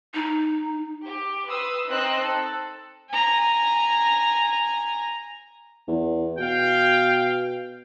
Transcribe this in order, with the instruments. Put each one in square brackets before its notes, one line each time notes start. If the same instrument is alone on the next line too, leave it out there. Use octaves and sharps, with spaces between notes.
[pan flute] D#4
[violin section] G4
B4 C6 D#6 E6
C4 D#4 D#5 C6 E6 F#6
A4
[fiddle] G#5 A#5
[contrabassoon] E2
[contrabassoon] B2 [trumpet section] F5 G5